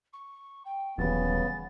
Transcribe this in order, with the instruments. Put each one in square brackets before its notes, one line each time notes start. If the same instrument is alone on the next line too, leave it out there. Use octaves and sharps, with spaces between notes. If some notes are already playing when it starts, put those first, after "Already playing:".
[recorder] C#6
G5
[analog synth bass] D#1 [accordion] C#3 B3 [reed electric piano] E3 F#3 G3 [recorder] A6